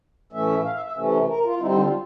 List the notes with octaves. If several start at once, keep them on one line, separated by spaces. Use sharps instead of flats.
A2 E3 A3 C#4 E5
F5
E5
E5
C3 E3 A3 C#4
A#4
F4
D3 G3 C4 D#4 E4
D#4
F4